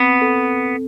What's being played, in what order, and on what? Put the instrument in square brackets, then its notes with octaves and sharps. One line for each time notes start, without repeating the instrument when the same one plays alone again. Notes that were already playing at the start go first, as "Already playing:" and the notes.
Already playing: [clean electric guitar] B3 [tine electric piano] C4
[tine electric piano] A4